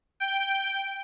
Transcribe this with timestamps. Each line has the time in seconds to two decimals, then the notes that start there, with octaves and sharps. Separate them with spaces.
0.20 G5